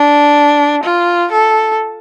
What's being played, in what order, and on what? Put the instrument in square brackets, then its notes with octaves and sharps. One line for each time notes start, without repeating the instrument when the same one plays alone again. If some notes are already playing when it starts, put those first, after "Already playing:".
Already playing: [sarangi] D4
F4
A4